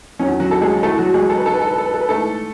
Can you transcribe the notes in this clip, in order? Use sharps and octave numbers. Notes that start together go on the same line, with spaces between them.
E2 D#3 F#3 C#4
F#3 F#4
A4
G#3 G#4
A2 E3 A3 A4
F#3 F#4
G#3 G#4
A4
B4
G#2 F#3 A4
B4
A4
B4
A4
B4
A4
B4
G#2 E3 A3 A4